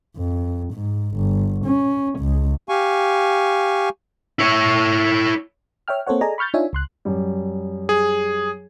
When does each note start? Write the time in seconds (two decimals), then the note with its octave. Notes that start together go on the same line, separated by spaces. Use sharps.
0.16 F2
0.73 G#2
1.16 G1
1.65 C#4
2.19 C#2
2.69 G4 F5 G#5 C#6
4.39 E4 C#5
5.88 C#5 E5 G5 F6
6.07 A#3 C4 A4 C5 C#5 F#5
6.21 G#4 A4 D5 D#5 G#5 A#5
6.38 B5 C#6 F6 G6 A6
6.54 D4 D#4 F4 C#5 E5 G#5
6.73 C#2 C6 F#6
7.05 F#2 G3
7.89 G#4